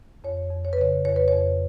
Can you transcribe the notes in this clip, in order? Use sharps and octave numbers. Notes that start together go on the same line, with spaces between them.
F2 C#5
F2
C#5
B4
C#3 C#5
F2 C#5
B4
F2 C#5